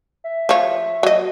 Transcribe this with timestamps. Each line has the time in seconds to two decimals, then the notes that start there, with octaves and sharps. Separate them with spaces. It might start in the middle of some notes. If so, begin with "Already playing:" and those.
0.24 E5
0.49 F3 C#5
1.03 F#3 D#5